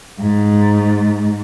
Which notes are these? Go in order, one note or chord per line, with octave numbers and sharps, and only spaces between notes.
G#2